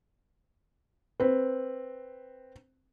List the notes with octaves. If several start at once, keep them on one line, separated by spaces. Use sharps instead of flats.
C4 B4